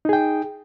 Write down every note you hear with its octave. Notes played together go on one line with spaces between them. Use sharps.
D#4 G#4 G5